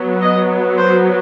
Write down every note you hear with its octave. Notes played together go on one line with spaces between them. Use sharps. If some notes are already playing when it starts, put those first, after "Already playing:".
Already playing: F#3 B3
D#5
C5